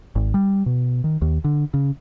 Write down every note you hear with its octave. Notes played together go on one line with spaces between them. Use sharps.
G#1
G3
B2
D#3
D#2
D3
C#3